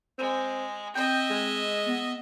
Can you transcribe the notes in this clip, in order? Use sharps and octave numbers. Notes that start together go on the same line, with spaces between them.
G#3 C4
C4 D#5 E5 G5
G#3
B3